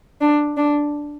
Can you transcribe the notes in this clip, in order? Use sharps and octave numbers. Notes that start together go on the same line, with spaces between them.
D4
D4